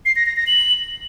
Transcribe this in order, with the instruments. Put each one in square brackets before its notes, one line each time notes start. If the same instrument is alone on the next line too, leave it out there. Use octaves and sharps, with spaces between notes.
[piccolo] C7
A#6
A#6
A#6
F#7